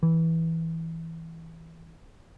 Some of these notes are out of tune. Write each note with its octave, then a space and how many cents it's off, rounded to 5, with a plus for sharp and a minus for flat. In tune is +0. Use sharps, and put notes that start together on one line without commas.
E3 -10